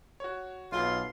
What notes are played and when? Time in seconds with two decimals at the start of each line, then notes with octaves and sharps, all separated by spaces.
0.20 F#4 C#5
0.72 B1 F4 C6